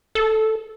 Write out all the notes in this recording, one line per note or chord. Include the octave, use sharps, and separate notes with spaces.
A4